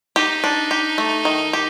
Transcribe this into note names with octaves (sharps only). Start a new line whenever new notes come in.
D#4 G4
D4
G4
A3
D#3
G4